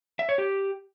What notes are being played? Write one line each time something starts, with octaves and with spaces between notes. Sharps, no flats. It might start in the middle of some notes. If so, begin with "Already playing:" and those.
E5
C#5
G4